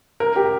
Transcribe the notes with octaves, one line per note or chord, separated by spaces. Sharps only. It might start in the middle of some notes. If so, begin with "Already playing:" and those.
A#4
G4